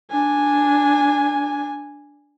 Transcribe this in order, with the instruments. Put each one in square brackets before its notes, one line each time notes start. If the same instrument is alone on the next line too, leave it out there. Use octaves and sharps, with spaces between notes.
[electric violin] D4 G#5